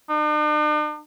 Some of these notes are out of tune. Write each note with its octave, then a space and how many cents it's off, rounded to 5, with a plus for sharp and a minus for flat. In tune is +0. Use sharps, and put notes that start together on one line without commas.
D4 +45